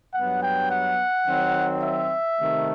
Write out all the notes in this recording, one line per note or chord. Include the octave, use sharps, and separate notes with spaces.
G2 F#3 B3 F#5
G5
F#5
D#3 F#3 C4
E5
C3 D#3 A3